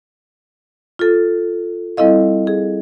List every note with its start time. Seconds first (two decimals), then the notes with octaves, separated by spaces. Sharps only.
0.99 F4 A4
1.97 G3 C4 E4 A4 D#5 F5
2.47 G#4